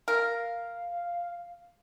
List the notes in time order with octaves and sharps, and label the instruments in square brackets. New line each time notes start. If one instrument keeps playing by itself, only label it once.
[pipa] A#4 [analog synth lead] F5